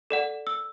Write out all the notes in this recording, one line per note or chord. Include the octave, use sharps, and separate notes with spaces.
A4 D5 F#5
E6